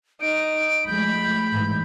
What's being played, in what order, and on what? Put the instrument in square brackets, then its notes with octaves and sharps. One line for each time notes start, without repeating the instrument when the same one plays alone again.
[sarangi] D#4 [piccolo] D7
[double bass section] F3 G#3 A3 [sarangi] B5 [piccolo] G6
[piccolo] G6
[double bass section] G#2 E3